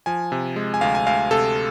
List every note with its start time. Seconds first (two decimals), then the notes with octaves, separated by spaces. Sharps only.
0.06 F3 G#5
0.32 C3
0.56 G#3
0.74 G#5
0.81 D2 F5
0.95 G#5
1.07 D2 F5
1.31 C3 A4